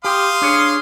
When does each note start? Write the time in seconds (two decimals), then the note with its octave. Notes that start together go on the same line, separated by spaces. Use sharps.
0.04 G4 F5 C6 D#6
0.42 D4 G#4 C#5